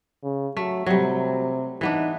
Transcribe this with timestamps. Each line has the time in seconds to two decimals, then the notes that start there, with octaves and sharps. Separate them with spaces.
0.24 C#3
0.57 F#3 A3
0.86 C3 F#3 G3
1.81 E3 B3 D4 D#4